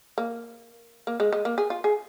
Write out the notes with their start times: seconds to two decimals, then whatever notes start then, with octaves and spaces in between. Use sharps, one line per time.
0.18 A#3
1.07 A#3
1.20 G#3
1.33 G#3
1.45 A#3
1.58 G#4
1.70 F4
1.84 G#4